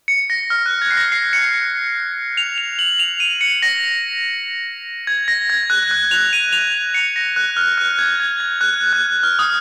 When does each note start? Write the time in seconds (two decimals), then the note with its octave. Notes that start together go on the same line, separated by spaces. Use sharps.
0.08 C#7
0.30 A#6
0.50 F6
0.66 F#6
0.82 G#6
0.91 C7
0.97 A#6
1.12 C7
1.33 C#7
1.54 C#7
2.37 F7
2.58 F7
2.79 F#7
2.99 F7
3.20 D#7
3.41 C#7
3.62 A#6
5.07 G#6
5.28 A#6
5.50 G#6
5.70 F#6
5.91 F#6
6.11 F7
6.33 D#7
6.53 F7
6.74 F7
6.94 C#7
7.16 A#6
7.36 F#6
7.57 F6
7.78 F#6
7.99 G#6
8.20 G#6
8.40 G#6
8.61 F#6
8.93 F#6
9.23 F6
9.39 D#6